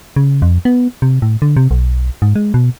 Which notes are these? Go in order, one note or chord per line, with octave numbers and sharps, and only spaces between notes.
C#3
F2
B3
C3
A2
D3
C3
B1
G#2
G#3
B2